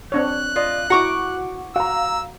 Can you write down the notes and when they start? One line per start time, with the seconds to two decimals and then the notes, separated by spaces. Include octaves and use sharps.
0.12 C4 D4 C#5 F#6
0.56 F4 D5 D#5
0.90 E4 F#4 F#5 A#5 C#6 D6
1.76 F#4 F5 A#5 E6